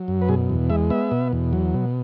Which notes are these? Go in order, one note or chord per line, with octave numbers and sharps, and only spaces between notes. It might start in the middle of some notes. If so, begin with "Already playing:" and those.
Already playing: F#3
F#2
B4
B2 G#4
E2
G#3 E5
B3 E5
B2
E2
F#3
B2